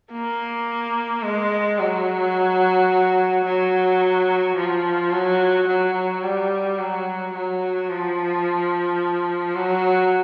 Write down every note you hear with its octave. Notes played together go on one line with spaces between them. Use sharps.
A#3
G#3
F#3
F#3
F3
F#3
F#3
G3
F#3
F#3
F3
F#3